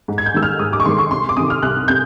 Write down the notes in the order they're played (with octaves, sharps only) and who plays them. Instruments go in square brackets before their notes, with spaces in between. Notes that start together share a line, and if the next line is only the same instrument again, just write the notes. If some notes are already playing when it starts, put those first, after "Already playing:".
[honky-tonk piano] G#2
G#6
G6
D#3 G#3 E6
F6
G#2 D#6
D6
C#6
D#3 G#3 C6
C#6
C2 C6
D6
C3 D#3 D#6
F6
C2 F#6
C3 G6